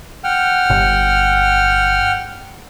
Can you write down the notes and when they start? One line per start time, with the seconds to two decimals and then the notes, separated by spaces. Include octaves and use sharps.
0.24 F#5 G5 F6
0.70 G1